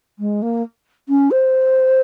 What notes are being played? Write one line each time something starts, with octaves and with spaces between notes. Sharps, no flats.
G#3
A#3
C#4
C5